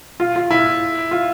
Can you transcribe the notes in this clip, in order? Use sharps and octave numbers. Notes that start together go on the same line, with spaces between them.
F4
F4
E4
F4